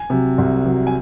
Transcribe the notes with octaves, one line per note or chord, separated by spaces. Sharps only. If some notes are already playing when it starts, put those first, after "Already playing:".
Already playing: G#5
C3 F#3
C2
C3 F#3
G#5